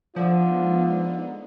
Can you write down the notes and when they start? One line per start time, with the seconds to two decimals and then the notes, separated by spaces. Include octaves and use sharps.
0.16 D3 F3 G#3 B3 D#4 F4